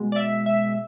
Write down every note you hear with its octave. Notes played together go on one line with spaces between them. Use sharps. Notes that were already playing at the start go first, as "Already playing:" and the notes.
Already playing: B2 G#3
D5
E5
E5